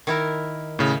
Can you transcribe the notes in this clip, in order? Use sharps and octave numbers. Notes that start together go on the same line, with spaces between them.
D#3 E4 A#4
A2 C#3